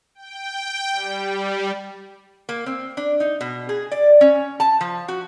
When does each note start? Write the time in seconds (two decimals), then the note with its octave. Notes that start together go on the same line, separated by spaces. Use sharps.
0.15 G5
0.91 G3
2.49 A#3
2.66 C4
2.97 D4
3.20 D#4
3.41 B2
3.69 G#4
3.91 D5
4.21 C#4
4.60 A5
4.81 F3
5.08 F#4